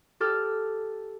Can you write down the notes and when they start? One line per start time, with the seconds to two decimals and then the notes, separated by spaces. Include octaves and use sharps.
0.20 G4 A4 F6